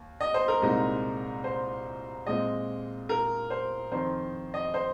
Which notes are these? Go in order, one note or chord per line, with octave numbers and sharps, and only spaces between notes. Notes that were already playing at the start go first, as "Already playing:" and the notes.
Already playing: D#2
D#5
C5
A#4
C2 A#2 G#3 C4 D#4
C5
A#2 G#3 C4 D#5
A#4
C5
F2 D#3 C4 D#4 C5
D#5
C5